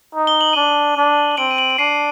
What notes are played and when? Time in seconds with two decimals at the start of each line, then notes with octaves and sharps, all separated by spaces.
0.15 D#4
0.27 G7
0.41 F#7
0.53 D4 D#7 G7
0.97 D4
1.31 G7
1.37 C4 D7 F#7
1.51 D#7
1.58 D7 F#7
1.70 D7
1.78 D4 C7 D#7